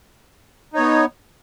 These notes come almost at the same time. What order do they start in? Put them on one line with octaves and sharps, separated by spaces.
D#4 C#5 B3